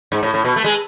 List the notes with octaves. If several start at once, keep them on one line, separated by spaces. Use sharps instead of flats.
G#2
A2
A2
B2
A3
G#3